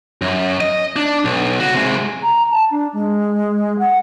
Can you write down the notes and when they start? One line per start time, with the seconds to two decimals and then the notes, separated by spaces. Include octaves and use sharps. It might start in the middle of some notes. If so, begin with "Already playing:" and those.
0.22 F#2
0.61 D#5
0.96 D4
1.25 B1
1.60 C#3 F#4
1.74 C3 G#3
2.23 A#5
2.51 A5
2.70 D4
2.93 G#3
3.79 F#5